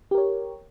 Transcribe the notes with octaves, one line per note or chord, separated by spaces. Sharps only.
G4 A#4 C#5